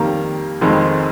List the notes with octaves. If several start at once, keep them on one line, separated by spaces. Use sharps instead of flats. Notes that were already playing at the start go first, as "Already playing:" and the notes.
Already playing: F2 D#3 G3 A#3 A#5
F1 F2 D#3 G#3 C4